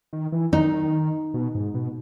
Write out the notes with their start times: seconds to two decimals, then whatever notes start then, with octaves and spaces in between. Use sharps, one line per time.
0.13 D#3
0.32 E3
0.52 D#3 D#4
1.34 B2
1.55 G#2
1.74 B2